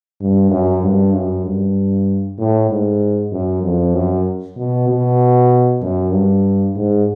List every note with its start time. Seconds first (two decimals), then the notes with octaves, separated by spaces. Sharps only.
0.20 G2
0.50 F#2
0.82 G2
1.13 F#2
1.45 G2
2.38 A2
2.70 G#2
3.32 F#2
3.63 F2
3.94 F#2
4.57 B2
4.88 B2
5.82 F#2
6.12 G2
6.75 G#2